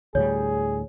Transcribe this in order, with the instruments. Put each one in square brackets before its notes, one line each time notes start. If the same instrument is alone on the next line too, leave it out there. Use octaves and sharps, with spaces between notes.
[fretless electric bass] D2 A2 G3 [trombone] G#4 [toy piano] C#5